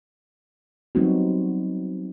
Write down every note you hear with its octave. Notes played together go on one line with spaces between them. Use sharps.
F#3 G3 B3 C4 D#4 F#4